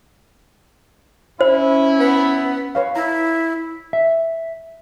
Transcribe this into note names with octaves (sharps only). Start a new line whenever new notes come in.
C#4 E4 C5
B3
B4 C#5 F5
E4 A#5
E5